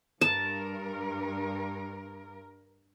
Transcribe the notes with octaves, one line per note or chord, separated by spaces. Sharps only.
G2 A#4 A5